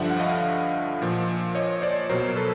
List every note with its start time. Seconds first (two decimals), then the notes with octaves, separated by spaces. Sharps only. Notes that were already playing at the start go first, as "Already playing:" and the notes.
Already playing: G2 D3 F3 E5 F#5
0.11 F#5
0.20 D#5 F5
1.02 A#2 F3
1.55 C#5 D#5
1.82 C5 D5
2.09 B2 F#3 A#4 C5
2.36 A4 B4